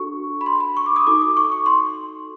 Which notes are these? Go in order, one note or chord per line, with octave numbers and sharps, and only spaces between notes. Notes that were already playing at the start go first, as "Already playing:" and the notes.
Already playing: D4 F#4 A4 C#6
B5
C6
B5
C#6
D6
D#6
D#4 F#4 A4 D6
D6
C#6
C#6
C6